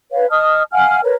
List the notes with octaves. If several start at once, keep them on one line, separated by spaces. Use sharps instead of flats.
B4 C#5 F5
D#5 A5 D#6 F6
F5 F#5 G#5 F6
A#4 B4 C#5